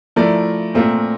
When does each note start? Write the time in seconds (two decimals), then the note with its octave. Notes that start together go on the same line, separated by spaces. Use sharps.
0.16 F3 A3 E4 A#4 D5
0.74 A#2 A3 C4 F4 A#4